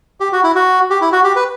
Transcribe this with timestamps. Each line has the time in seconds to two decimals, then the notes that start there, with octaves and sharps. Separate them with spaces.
0.20 G4
0.33 F#4
0.44 E4
0.55 F#4
0.90 G4
1.01 E4
1.12 F#4
1.24 G4
1.36 B4